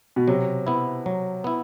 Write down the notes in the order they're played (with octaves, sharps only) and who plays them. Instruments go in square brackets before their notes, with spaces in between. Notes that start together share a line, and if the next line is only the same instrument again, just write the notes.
[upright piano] B2
[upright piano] C3 [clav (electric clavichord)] F#3
[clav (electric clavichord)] B3 E4
F#3
B3 E4